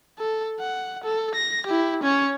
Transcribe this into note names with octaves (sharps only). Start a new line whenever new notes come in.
A4
F#5
A4
A#6
E4 G4
C#4 C#5